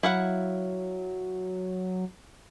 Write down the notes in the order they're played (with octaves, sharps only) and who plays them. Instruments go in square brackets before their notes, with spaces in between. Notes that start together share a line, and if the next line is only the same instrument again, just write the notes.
[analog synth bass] F#3 [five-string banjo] E4 F5 F#5